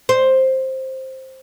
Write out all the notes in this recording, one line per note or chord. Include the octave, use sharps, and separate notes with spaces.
C5